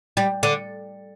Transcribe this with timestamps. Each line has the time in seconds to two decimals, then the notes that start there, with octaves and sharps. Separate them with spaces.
0.17 G3
0.43 D3